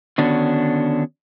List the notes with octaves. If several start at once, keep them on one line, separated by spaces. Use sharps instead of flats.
D3 D#3 B3 C#4 D4 F#4